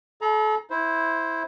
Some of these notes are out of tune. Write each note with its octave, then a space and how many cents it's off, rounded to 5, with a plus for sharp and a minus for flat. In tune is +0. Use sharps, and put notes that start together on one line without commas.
A4 -35 A#5 +25
E4 -5 C5 +0